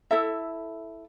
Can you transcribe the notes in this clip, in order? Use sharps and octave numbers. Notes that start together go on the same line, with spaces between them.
E4 A4 E5